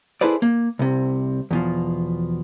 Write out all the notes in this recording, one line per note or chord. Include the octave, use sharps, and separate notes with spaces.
E4 G#4 A4 B4 C5 D5
A#3
C2 C3
E2 B2 F3